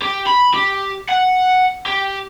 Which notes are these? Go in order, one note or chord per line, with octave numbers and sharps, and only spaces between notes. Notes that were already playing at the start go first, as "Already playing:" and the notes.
G4
B5
G4
F#5
G4